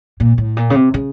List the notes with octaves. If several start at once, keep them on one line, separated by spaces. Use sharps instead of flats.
A#2
A2
A#2
C#3
C3
C#3